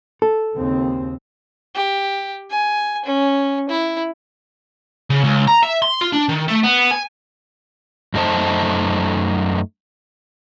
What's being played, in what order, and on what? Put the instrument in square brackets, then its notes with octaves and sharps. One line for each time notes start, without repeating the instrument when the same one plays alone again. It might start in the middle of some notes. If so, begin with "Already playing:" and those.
[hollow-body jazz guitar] A4
[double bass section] D#2 C#3 C4
[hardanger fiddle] G4
G#5
C#4
E4
[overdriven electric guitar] C#3
C#2
A#5
E5
C6
F4
D4
D#3
A3
B3
G#5
[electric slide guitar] F#2 A3 D#4 C5 A5